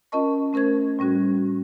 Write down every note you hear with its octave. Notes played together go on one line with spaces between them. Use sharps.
C#4 F4 A#4 D#5 A5 C#6
A3 C#4 A#4 C5 G#6
A2 G3 C#4 F#4